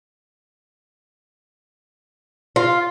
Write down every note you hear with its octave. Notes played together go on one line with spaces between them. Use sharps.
F4